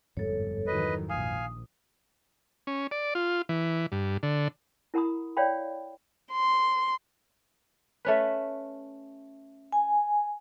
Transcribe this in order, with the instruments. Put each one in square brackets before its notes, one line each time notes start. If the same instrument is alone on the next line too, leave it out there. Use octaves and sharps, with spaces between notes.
[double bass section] G1 [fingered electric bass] F2 G#2 G3 [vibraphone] A4 C#5
[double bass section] D#3 E3 F#3 [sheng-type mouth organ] B4 D#5
[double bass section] A#1 [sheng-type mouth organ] F5 G#5 [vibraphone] D#6
[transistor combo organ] C#4
D5
F4
E3
G2
D3
[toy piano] E4 A#4 F#5 A#5 B5 D#6
C#5 D5 F5 G5 B5
[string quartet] C6
[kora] A3 C#4 B4
[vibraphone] G#5